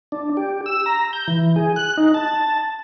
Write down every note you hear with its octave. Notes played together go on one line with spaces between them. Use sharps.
D4
G4
E6
A#5
G6
E3
G#4
F#6
D#4
A5